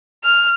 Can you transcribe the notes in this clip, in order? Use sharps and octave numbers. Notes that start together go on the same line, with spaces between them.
F6